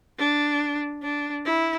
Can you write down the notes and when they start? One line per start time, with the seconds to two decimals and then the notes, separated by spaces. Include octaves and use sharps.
0.18 D4
1.02 D4
1.45 E4